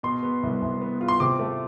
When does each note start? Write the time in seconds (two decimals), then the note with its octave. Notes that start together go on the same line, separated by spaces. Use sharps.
0.03 B2 C6
0.23 B3
0.43 C2
0.62 C2
0.81 B3
1.01 F4
1.08 C6
1.20 C3 D6
1.39 A3